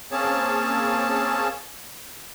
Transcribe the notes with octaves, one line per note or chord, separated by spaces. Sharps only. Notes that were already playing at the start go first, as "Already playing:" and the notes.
A#3 C4 C#4 G#4 C#5 A5